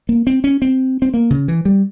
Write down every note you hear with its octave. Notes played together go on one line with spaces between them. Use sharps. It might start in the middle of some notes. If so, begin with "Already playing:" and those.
A#3
C4
C#4
C4
C4
A#3
C#3
E3
G3